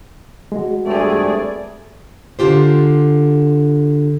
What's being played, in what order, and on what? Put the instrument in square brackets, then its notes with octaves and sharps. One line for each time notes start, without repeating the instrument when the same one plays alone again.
[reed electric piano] G#3 F#4
[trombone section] G2 A3 C4 [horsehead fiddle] G#4 D5
[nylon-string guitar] D3 F4 G4 C5